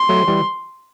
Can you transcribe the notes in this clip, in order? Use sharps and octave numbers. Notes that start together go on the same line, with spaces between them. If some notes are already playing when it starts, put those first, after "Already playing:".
Already playing: C6
F#3 A3
E3 G3